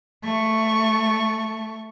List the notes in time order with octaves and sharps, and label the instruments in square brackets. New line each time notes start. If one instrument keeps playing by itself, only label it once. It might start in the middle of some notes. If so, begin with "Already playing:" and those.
[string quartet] A3 [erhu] C#6